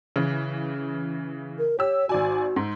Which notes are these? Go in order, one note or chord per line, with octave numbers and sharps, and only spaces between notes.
C#3 E3
A#4
G4 C#5 E6
G#1 F#4 D5 G#5
G#2